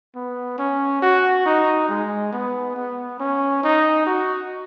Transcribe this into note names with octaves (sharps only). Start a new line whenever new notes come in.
B3
C#4
F#4
D#4
G#3
B3
B3
C#4
D#4
F#4